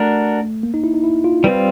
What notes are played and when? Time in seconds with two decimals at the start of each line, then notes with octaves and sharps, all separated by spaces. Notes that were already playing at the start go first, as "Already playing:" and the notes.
Already playing: A3 D4 F#4 A#4
0.63 A#3
0.74 D#4
0.84 E4
0.94 D#4
1.04 E4
1.24 F4
1.44 G3 C4 F4 B4